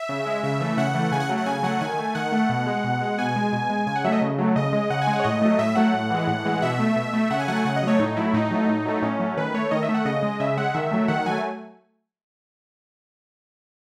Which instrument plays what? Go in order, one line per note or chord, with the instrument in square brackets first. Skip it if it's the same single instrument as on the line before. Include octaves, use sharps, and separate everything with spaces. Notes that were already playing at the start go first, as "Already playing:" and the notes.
Already playing: [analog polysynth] E5
C#3
G#3
C#3 E5
E3 A3
C#3 F#5
E3 A3
C#3 G#5
F#5
F#3 A3
F#5
C#3 G#5
F#3 A3 F#5
D#3 G#5
A3
D#3 F#5
A3
B2
G#3
B2
G#3
B2 G#5
G#3
B2
G#3
C#3 G#5
F#5
F#3 A3 E5
D#5
C#3
F#3 A3
C#3 D#5
G#3
C#3 F#5
G#5
G#3
F#5
C#5
A2 D#5
F#3 A3
A2 E5
F#3 A3 F#5
A2
E3 G#3
A2
E3 G#3
B2 E5
A3
B2
A3
C#3 F#5
G#5
F#3 A3 F#5
G#5
C#3 F#5
D#5
F#3 A3 C#5
A2 D#4
F#3 A3 E4
A2 D#4
F#3 A3
A2
F#3 A3
A2 C#4
F#3 A3
D#3 B4
A3 C#5
D#3 D#5
E5
A3
F#5
C#3 D#5
G#3
C#3 E5
G#3 F#5
D#3 E5
F#3 A3
D#3 F#5
F#3 A3 G#5